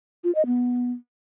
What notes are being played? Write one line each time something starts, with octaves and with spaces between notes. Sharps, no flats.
F4
D#5
B3